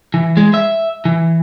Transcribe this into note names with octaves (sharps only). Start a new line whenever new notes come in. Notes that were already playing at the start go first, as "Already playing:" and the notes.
E3
G#3
E5
E3